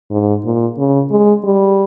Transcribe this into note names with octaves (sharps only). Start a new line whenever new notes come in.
G#2
A#2
C#3
G#3
G3